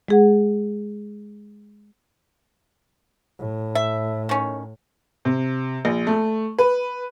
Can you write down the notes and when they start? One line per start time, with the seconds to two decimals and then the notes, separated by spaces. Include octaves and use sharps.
0.08 G#3 G#4 F#5
3.39 A2
3.75 E5
4.29 D#3 C#4
5.25 C3
5.85 A#1
6.07 A3
6.59 B4